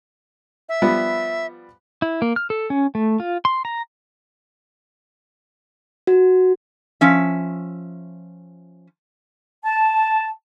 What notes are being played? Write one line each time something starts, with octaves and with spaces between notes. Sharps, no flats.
E5
F3 G3 B3
E4
A#3
F6
A4
C#4
A3
F4
C6
A#5
F#4
F3 C#4 E5
A5